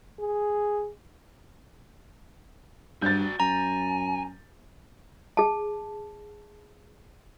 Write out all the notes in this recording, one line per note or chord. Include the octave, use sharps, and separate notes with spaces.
G#4
G2 F#4 D5 G6 A6
F#2 G#5 A#5
G#4 A5